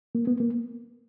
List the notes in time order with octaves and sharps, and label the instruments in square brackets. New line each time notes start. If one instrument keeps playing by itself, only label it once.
[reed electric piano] A#3
B3
A#3